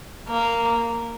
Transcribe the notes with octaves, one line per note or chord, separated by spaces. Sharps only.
A#3